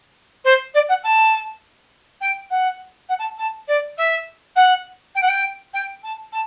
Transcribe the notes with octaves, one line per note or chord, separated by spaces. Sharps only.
C5
D5
F#5
A5
G5
F#5
F#5
A5
A5
D5
E5
F#5
G5
F#5
G5
G5
A5
A5